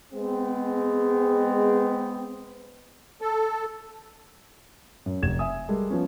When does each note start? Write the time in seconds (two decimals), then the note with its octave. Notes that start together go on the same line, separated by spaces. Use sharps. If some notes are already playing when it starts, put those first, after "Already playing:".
0.12 G#3 B3 C4
3.21 A4
5.06 F#2
5.22 F1 G#6 E7
5.39 E5 G#5 D#6
5.68 G3 G#3 A4 A#4
5.90 F3 B3 C#4